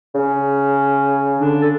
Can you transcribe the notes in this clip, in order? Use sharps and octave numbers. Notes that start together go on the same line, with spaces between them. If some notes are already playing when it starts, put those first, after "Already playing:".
C#3 C#4
D3 D4
A4